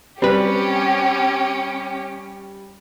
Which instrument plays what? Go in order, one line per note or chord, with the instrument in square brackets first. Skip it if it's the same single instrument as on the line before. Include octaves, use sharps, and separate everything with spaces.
[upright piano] G3 [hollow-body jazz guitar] C4 B4 [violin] C#4 G4